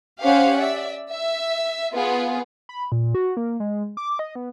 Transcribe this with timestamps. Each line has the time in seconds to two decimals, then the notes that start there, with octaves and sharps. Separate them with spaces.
0.22 C#4 G4 C5 F5 F#5
0.58 D5 E5
1.10 E5
1.94 B3 F4 G#4
2.69 B5
2.92 A#2
3.15 F#4
3.37 A#3
3.60 G#3
3.97 D6
4.19 D#5
4.35 B3